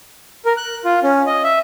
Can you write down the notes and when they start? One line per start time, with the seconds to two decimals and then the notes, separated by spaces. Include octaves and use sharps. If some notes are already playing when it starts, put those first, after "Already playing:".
0.45 A#4
0.57 F#6
0.85 F4
1.03 C#4
1.26 D#5
1.44 E5